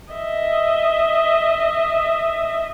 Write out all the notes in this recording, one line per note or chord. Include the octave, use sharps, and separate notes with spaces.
D#5 E5